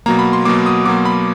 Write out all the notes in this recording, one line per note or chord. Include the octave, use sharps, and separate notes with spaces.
B2 F#3 A#3 A#5
B5
C6
B2 F#3 A#3 D6
D#6
B2 F#3 A#3 D6
B5